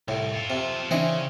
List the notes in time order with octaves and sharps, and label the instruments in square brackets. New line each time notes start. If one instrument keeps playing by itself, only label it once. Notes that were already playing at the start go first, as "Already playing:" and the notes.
[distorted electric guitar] C2 [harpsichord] A2
[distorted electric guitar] F4 A4
[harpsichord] C3
[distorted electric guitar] C#3 [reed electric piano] E3 D4 [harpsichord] C4 E4 D#5